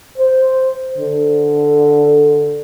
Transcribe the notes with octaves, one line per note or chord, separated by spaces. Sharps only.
C5
D3